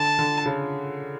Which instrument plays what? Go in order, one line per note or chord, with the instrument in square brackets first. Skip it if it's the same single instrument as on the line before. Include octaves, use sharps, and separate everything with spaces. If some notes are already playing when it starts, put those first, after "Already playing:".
Already playing: [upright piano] D3 [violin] A5
[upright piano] D3
C#3